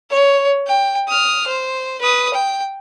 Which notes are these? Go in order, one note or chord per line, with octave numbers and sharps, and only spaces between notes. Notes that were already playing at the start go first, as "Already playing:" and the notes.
C#5
G5
D#6 F6
C5
B4 D#6
G5